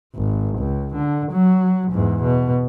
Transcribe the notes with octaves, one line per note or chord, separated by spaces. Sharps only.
G#1
C#2
D3
F#3
E2 G#2
B2